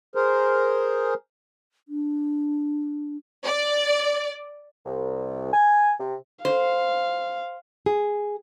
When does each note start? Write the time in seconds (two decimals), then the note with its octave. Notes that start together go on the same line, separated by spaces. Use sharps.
0.15 G#4 A#4 C5
1.88 D4
3.46 D5
4.85 C2
5.52 G#5
5.99 C3
6.45 C5 F5
7.86 G#4